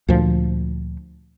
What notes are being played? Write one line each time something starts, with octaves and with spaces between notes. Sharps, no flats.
D2 A#2 F3